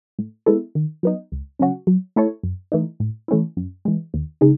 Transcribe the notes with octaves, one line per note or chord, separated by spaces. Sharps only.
A2
G#3 B3 E4 A4
D#3
F#3 B3 D#4
C#2
C#3 F#3 C#4 F#4
F#3
A3 E4 A4 C#5
F#2
E3 A3 D#4
A2
E3 A3 C#4 E4
F#2
E3 G#3
D#2
C#3 G#3 D#4